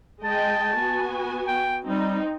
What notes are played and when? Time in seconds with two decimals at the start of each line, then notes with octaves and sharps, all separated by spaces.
0.24 G#3 D#5 G5 A5
0.77 B3 F#4 G#5
1.48 G5
1.86 G3 C4 D#4